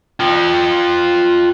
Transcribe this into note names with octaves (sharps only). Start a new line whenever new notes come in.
F4 G5